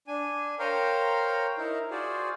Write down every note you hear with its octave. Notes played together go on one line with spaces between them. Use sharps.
D4 G#5
A#4 C5 C#5 F5 G5 A#5
D#4 E4 A#4
F4 F#4 G#4 C5 D5